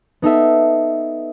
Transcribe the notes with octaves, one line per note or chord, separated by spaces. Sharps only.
B3 D#4 A4 E5